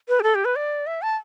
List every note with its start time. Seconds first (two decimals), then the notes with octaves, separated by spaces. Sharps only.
0.09 B4
0.20 G4
0.23 A4
0.35 G4
0.45 B4
0.56 D5
0.87 E5
1.02 A5